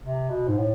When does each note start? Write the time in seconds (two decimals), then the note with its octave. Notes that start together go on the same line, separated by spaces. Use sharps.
0.03 C3
0.30 B2
0.48 G#2
0.57 A2